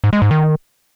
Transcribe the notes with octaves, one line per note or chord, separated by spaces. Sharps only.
G#2
G#3
G#2
D#3